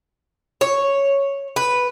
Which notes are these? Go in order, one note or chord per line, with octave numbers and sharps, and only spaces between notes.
C#5
B4